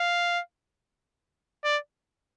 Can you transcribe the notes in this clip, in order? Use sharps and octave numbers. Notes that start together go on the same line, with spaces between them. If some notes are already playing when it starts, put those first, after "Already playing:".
Already playing: F5
D5